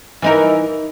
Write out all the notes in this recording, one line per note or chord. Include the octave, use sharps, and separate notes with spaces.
E3 D#4 A#4